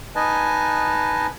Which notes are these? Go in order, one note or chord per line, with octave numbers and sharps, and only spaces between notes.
D#4 B4 D#5 G#5 A5